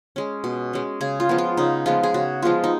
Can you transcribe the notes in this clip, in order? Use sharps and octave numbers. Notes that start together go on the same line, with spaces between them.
G#3 C#4
B2
G#3 C#4
C#3 G#4
F4
F3 G#3 B3
F4
C#3 D#4
F3 G#3 B3 F4
G#4
C#3 F#4
F3 G#3 B3 F4
D#4